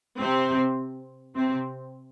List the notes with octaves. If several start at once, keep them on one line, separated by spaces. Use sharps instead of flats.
C3 C4
C3 C4